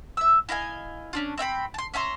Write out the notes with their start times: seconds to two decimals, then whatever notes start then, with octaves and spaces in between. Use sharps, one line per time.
0.17 E5 E6
0.49 E4 D#5 F5 G#5
1.13 C#4 D4 F4
1.38 C4 E5 G5 B5
1.74 A5 C6
1.94 C#4 E5 A#5 C6